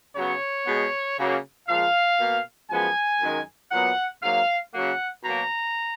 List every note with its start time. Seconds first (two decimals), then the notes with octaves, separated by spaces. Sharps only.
0.16 C#3 F#3 B3 C#5
0.67 B2 G#3 B3
1.18 C#3 F#3 A#3
1.69 A#2 F3 G#3 F5
2.19 B2 A#3
2.70 F#2 F3 G#3 B3 G#5
3.21 F#2 D#3 G#3
3.71 A#2 F#3 B3 F#5
4.22 G#2 F#3 A#3 F5
4.73 C#3 F#3 A#3 F#5
5.24 B2 F#3 A#3 A#5